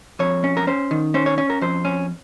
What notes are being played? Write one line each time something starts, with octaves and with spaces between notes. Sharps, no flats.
F2 C#5
C#4
A#4
C#4 C5
D#3
C#4 C5
C#5
C#4 C#5
A#4
F2 C5
C#4